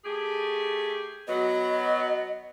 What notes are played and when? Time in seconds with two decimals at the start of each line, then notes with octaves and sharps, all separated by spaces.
0.05 A3 G4 G#4
1.28 F#3 B3 D#5